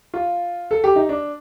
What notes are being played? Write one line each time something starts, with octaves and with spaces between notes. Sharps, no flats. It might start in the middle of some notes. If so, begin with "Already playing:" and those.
F4
A4
G4
D#4
D4